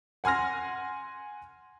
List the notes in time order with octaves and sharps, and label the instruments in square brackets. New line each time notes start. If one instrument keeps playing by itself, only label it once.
[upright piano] F#5 G#5 C6 F6 A#6